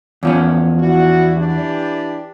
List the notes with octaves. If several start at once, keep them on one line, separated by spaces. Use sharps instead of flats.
E2 F3 C#4
D4 E4 F#4
E3 D4 G4